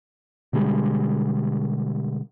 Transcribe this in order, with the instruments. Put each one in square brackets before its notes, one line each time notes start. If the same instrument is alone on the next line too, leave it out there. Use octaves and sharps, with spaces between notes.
[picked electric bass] B2 D3 G3 G#3